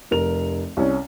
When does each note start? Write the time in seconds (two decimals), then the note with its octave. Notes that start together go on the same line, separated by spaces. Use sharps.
0.11 F1 A#4 F7
0.77 C2 C#4